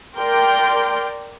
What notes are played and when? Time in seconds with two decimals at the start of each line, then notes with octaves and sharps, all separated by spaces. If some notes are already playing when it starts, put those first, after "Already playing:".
0.17 A#4 D5 G5 C6